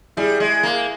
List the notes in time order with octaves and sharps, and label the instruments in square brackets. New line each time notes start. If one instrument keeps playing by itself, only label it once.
[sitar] G3 [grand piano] E4 G#4
[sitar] G#3
A#3